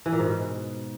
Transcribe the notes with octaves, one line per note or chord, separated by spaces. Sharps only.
E3
A#2
G#2
B2